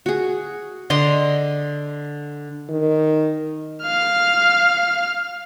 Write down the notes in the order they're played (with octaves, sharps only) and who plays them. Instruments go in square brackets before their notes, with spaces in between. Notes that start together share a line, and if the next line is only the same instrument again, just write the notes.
[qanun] F#4 G#4
D3 D#5 C6 D6
[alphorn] D#3
[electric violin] F5 F6